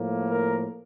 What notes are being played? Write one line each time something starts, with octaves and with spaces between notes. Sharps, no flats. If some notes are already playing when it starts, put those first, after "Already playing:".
Already playing: A2 F3 A#3
A#4